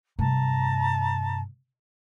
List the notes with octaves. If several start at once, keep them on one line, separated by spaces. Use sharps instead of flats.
G2 C3 A5 A#5